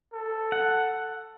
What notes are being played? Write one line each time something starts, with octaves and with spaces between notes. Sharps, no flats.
A4
F#5